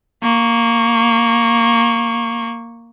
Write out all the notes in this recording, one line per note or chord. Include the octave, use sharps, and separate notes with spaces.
A#3 C#6